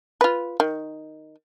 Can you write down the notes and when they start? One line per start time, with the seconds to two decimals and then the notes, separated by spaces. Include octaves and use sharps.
0.21 F4 B4
0.60 D#3